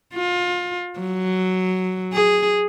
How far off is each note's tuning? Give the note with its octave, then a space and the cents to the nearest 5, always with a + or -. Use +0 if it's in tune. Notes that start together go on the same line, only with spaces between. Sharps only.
F4 +25
F#3 +5
G#4 -5